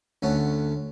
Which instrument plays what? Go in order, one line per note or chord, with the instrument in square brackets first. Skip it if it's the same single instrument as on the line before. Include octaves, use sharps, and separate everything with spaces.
[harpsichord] D2 A3 C#4 F#5